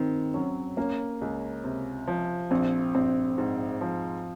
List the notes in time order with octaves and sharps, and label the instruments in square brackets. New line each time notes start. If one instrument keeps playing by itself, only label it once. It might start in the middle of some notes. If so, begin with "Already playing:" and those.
Already playing: [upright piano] D#3 [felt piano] C4
[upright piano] F#3 [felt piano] C#4
[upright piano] A#3 [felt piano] C#4
[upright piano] C#2
C3
F3
[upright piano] A#1 [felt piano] C4
[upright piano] A#1 [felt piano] C4
[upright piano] G#2
F3